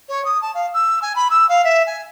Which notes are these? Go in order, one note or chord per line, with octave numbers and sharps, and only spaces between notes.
C#5
D#6
A5
F5
E6
G#5
B5
E6
F5
E5
G#5